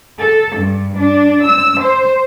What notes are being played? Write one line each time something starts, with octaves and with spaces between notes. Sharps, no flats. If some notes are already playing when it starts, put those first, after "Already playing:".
A4
G2
D4
E6
C5